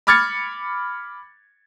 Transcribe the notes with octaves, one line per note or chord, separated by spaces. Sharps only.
B5 D6 F6 G#6 A6 C#7